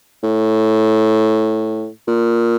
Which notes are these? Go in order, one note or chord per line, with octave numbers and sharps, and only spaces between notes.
A2
A#2